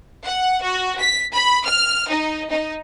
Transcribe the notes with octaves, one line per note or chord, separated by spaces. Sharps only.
F#5
F#4
B6
B5
F6
D#4
D#4